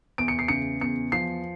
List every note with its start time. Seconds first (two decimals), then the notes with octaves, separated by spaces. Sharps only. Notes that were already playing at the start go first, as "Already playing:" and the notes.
0.18 E2 D7
0.28 C#7
0.39 C7
0.48 C#3 C#7
0.81 E2 C#7
1.12 F3 C7